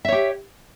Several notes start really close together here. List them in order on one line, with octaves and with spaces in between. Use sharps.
E5 C#5 G4